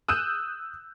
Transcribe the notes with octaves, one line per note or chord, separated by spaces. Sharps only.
D#6 E6 F#6 G6 D#7 E7